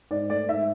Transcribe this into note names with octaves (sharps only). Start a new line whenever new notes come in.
G#2 D5
A3 D5
G#2 E5